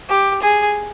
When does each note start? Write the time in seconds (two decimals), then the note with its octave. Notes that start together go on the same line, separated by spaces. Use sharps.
0.10 G4
0.42 G#4